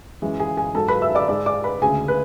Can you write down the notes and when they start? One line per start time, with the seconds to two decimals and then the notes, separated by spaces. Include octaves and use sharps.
0.22 F#2 E3 G#3
0.40 G#4 G#5
0.57 G#4 G#5
0.75 G#2 F#3 A4 A5
0.88 B4 B5
1.02 E5 E6
1.15 D5 D6
1.28 G#2 G#3 D5 D6
1.46 D5 D6
1.64 B4 B5
1.82 D2 C#3 G#3 G#4 G#5
2.08 B4